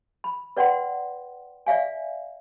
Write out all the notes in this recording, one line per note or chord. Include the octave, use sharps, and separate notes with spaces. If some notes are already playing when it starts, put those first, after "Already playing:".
B5
B4 D5 F#5 G5 C6
D5 E5 F5 G#5